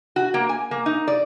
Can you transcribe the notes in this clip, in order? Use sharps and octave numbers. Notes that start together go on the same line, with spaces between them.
F#4
A#3
G#5
A#3
D#4
D5